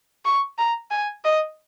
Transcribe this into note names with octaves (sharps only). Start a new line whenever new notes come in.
C#6
A#5
G#5
D#5